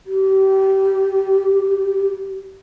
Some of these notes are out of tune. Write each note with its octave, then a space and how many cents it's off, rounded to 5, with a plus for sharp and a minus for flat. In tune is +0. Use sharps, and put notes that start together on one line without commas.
G4 -25